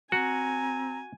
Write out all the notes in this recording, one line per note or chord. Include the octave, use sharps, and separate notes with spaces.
C4 F#4 G#5 A#5